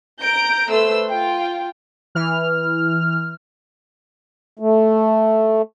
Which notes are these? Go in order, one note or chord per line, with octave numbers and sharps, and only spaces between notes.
A#5 G6 D7
A3 B4 C5 C6 E6
F4 G5
E3 F6
A3